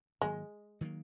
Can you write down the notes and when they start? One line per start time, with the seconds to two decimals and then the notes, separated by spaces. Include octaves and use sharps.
0.21 G#2 D#3 F#3 G#3 A#3
0.81 D#3 F#3 A#3